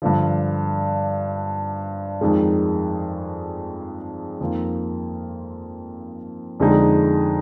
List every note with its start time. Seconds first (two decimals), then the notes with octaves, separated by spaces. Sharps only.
0.02 G2 D3 F3
2.21 F2 D#3 G#3
4.41 F2 D#3 A#3 F4
6.60 F2 D3 G#3 D#4 G#4